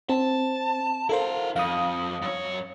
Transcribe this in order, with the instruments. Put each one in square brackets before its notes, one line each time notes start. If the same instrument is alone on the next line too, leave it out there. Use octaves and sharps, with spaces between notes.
[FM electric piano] C4 [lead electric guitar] A5
[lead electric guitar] E4 F5 [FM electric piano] A4 A#4 C5
[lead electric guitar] F2 [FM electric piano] F5 D#6
[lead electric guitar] F#2 C#5